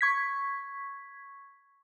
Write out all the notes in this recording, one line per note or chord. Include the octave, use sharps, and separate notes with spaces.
C#6 G#6 B6